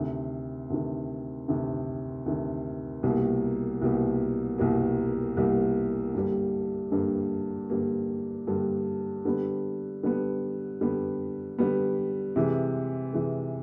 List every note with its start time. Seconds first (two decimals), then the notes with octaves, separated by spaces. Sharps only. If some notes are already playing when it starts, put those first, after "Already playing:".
Already playing: D2 C3 D#3
0.70 D2 C3 D#3
1.48 D2 C3 D#3
2.26 D2 C3 D#3
3.03 C2 B2 G3 A#3
3.81 C2 B2 G3 A#3
4.58 C2 B2 G3 A#3
5.37 C2 B2 G3 A#3
6.14 G2 D3 G3 A#3
6.92 G2 D3 G3 A#3
7.69 G2 D3 G3 A#3
8.47 G2 D3 G3 A#3
9.25 D3 G3 B3
10.03 D3 G3 B3
10.81 D3 G3 B3
11.58 D3 G3 B3
12.36 C3 E3 G#3
13.13 C3 E3 G#3